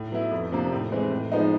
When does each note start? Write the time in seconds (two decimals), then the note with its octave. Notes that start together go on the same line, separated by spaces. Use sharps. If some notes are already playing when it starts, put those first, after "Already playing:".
Already playing: A2
0.12 F#3 B3 E4
0.31 F2
0.52 C3 F3 A#3 D4
0.72 A2
0.92 E3 G#3 C4
1.11 A2
1.32 F3 G#3 B3 D#4